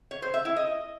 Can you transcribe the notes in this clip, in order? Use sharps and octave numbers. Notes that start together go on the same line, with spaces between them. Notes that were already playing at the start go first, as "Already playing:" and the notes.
C#5
C5
E5
E4
D#5